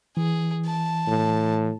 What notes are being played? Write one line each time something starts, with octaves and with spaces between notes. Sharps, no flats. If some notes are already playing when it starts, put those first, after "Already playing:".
E3 G#4
A5
A2